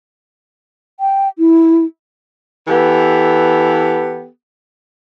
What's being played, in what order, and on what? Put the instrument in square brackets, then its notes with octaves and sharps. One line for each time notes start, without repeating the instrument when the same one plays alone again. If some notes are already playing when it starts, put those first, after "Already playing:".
[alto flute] G5
E4
[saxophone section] E3 B3 G4 A4